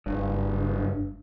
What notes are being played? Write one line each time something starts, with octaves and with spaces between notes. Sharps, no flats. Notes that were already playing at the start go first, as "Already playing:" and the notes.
F#1 G2